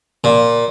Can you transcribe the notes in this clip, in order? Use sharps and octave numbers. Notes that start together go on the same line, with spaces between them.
A#2